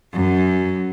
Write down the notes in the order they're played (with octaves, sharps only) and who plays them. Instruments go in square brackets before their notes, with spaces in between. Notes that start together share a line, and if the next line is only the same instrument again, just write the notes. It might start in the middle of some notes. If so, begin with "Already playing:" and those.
[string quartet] F#2